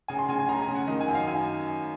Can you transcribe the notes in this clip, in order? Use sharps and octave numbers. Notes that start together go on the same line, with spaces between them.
C#3 G#5
C6
C#3 G#5
G#5
C#3 A#5
G#5
C#3
F#5
D#3 D#5
G#5
F#2
F5
F#2 G#5